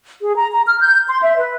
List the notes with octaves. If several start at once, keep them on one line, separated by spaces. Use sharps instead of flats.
G#4
A#5
A#5
F6
G6
C6
E5
B4